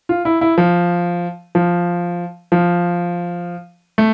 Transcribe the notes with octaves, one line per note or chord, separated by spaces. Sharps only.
F4
E4
E4
F3
F3
F3
A3